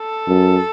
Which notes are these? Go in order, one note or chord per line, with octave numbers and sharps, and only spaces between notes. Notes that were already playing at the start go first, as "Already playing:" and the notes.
Already playing: A4
F#2